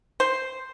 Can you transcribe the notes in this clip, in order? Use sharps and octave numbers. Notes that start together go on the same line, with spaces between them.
C5